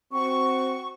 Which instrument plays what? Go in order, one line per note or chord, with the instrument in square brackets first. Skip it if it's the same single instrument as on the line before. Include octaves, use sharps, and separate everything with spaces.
[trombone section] C4 F#4 [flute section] C#6